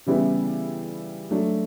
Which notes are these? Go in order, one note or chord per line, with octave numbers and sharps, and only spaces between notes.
C#3 E3 G3 B3 E4
F#3 A3 D4